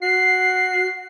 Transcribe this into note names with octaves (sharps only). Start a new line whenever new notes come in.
F#4 C7